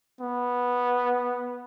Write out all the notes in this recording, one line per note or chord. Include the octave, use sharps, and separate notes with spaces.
B3